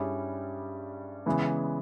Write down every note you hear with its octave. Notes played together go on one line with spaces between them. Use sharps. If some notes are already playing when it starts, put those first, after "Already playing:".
Already playing: G2 G3 C#4 E4 G#4
C#3 E3 G#3 B3